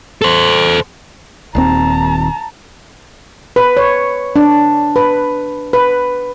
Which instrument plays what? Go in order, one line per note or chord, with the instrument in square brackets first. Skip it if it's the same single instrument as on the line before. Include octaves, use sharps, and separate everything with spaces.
[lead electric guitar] A4 C5
[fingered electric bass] D#1 D#2 C4 [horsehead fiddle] A5 A#5
[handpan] B4
C#5
D4
B4
B4